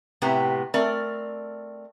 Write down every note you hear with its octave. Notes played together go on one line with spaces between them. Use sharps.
A2 C3 B3 G4 A#5
A3 C4 A#4 D5